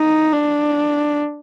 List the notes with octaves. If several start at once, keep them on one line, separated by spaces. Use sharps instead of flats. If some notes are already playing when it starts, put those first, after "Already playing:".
Already playing: D#4
D4